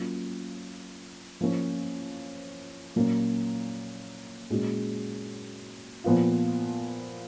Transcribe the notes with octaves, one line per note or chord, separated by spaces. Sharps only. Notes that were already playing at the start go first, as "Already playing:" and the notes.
Already playing: F#3 A#3 C#4 F4
F3 A#3 C#4
A#2 F#3 A#3 C#4
A#2 G#3 C#4 F#4
A#2 F3 B3 F4